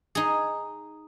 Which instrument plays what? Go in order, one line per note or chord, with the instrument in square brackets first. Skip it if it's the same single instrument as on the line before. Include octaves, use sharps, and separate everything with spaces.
[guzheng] D#4 G#4